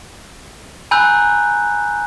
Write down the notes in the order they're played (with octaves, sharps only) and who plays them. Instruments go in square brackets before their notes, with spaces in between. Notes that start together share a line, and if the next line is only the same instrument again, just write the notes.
[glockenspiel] G#5 A#5 B5 E6 F#6 G6